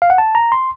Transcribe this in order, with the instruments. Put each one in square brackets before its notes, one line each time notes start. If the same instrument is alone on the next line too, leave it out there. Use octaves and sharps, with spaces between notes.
[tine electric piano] F5
F#5
A5
A#5
C6